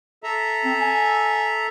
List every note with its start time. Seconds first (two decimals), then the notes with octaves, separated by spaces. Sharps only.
0.24 A4 E5 A#5
0.65 C4
0.81 G#5